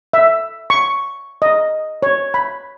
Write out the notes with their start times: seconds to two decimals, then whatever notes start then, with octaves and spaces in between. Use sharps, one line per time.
0.13 E5
0.70 C#6
1.42 D#5
2.02 C#5
2.34 B5